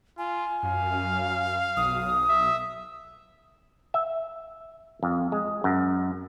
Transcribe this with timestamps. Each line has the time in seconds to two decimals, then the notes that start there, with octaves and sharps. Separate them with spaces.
0.18 F4 G#5
0.63 F#2 F5
1.77 B1 D#6
2.29 E5
3.94 E5
5.03 F2
5.32 G#3
5.64 F#2